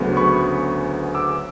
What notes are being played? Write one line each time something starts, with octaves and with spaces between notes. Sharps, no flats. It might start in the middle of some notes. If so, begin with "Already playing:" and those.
Already playing: D2 C#3 F#3 B3
B5 C#6
D6 E6